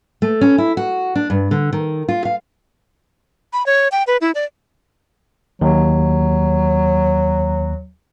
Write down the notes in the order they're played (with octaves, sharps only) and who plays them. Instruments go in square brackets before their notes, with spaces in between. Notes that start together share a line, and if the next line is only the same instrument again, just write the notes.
[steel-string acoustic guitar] A3
C#4
E4
F#4
D4
G2
D3
D#3
F4
F5
[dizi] B5
C#5
G5
B4
E4
D5
[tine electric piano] D#2 [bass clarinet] F#3